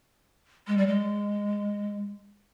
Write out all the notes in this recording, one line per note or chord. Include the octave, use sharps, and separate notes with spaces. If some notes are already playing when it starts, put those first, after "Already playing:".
G#3
G3
G#3